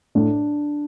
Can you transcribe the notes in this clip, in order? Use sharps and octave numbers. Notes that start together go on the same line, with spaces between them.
A2 D4